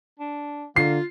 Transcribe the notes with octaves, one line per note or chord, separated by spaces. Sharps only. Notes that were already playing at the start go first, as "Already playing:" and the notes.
D4
D3 A#3 F4 C7